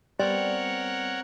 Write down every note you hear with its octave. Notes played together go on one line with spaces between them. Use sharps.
G3 B3 C4 A#4 C#5 D5 F#5